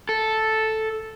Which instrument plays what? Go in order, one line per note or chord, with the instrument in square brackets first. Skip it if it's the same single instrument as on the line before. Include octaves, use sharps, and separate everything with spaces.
[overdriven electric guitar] A4